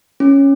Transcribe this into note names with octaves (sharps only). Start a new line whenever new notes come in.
C#4